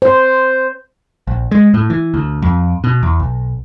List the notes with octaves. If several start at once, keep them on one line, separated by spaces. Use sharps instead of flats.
C5
A#1
G#3
A2
E3
D2
F2
B2
E2
B1